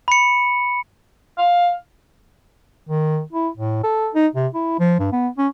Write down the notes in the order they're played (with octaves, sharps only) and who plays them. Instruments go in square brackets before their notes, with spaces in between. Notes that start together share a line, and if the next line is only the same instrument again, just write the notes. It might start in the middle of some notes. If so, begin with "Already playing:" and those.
[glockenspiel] B5 C#7
[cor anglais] F5
[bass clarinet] D#3
E4
A2
A4
D#4
C3
E4
F3
G2
B3
C#4